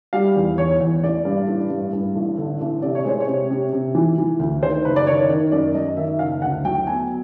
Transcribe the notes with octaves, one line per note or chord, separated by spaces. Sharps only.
G3 F5
E2
E2 C#5
E2
A1 D5
G2
A1
G2
G2
A1
D3
A1
C3 D5
C#5
G#3 C5
C#5
C3
C3
C3
E3
E3
D2
D#3 C5
F#1 B4
D5
D#3 C#5
D#3
F#2 D5
F#2 D#5
D#3 E5
F#1 F5
D2 F#5
F#3 G5
B3 G#5